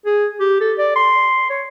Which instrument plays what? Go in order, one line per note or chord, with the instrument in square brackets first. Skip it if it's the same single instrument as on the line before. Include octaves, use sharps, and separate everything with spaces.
[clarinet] G#4
G4
A4
D5
C6
C#5